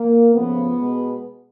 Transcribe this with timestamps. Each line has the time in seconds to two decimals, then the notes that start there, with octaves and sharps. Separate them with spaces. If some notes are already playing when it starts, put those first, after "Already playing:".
Already playing: A#3
0.33 C#3 F3 A3 B3
0.79 B2 G#3